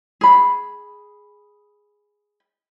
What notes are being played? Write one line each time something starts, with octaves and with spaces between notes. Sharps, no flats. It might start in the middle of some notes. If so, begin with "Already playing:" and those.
G#4 B5